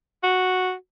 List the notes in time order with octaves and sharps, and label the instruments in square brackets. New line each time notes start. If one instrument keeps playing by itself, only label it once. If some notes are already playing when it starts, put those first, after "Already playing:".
[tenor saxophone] F#4